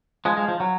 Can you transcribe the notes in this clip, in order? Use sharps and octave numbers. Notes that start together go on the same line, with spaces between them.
F3 G#3
F3 G#3
F3
F#3